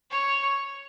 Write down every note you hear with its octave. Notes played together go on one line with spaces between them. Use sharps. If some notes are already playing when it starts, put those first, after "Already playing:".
C#5